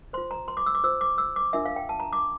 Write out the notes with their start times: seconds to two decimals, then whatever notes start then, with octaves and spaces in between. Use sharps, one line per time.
0.13 F4 C5 C6
0.31 A#5
0.48 C6
0.57 D6
0.66 E6
0.75 D6
0.84 F4 C5 E6
1.01 D6
1.18 E6
1.36 D6
1.53 D4 F4 A#4 E5
1.66 F5
1.76 G5
1.89 A5
2.00 A#5
2.13 D6